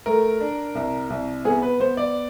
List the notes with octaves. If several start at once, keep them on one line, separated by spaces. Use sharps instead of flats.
A3 A#4
D4
C2
C2
B3 G#4
B4
B3 C5
D5